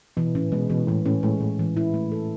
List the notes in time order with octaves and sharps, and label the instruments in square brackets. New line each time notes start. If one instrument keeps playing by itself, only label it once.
[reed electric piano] B2 [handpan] E3
[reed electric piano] A2 [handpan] C#4
[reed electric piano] B2 [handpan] G#3
[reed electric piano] B2 [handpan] E3
[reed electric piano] A2 [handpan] E3
[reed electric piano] A2 [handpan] C#4
[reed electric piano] A2 [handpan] G#3
[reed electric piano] A2 [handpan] E3
[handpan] E3
E4
A3
A4